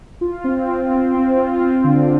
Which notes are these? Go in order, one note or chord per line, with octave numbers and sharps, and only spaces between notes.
F4
C4
F4
C4
C4
F4
C4
D3